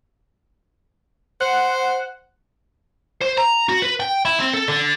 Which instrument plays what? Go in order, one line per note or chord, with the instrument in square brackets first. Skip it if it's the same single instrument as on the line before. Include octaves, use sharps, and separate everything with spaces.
[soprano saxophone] C5 [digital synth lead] F#5
[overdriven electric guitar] C5
A#5
F#4
B4
G5
E4
C4
A4
D3